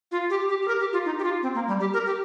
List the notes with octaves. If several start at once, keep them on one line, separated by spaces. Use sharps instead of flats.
F4
G4
G4
G4
A#4
G4
F4
D#4
G4
F4
C4
A#3
G3
G4
A#4
G4